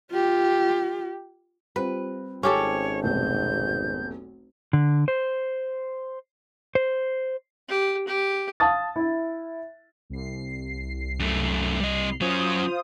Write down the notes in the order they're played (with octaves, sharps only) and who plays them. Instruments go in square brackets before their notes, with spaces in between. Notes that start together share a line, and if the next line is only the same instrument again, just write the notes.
[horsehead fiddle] F4 G4
[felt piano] G3 C4 F4 [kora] B4
[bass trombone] G#1 [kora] C#4 G4 A4 [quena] C#5
[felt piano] F1 B1 [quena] G6
[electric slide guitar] D3
C5
C5
[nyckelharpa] G4
G4
[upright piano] F5 A5 D#6 A6
E4 E5
[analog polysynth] C2 C7
[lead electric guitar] F#2 A3
G3 D#5
[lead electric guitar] F#3 C#4 [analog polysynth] F4 C5 D#6